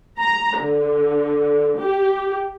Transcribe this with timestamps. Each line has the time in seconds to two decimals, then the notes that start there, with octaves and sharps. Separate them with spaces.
0.19 A#5
0.59 D3
1.79 G4